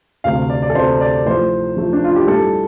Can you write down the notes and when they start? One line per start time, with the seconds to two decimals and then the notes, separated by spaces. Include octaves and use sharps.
0.24 D2 C3 A3 F5
0.50 D5
0.63 D5
0.70 A4
0.75 D2 C3 A3 C5
1.01 D5
1.26 A2 F3 A3 C5
1.77 A2 F3 A3
1.93 D4
2.04 F4
2.16 G4
2.28 A2 G3 A4